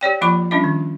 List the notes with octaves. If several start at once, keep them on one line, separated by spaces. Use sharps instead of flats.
G4 C#5 D5 G5
F3 A#3 F4 B5 C#6
G3 C#4 D4 F4 D#5
D#3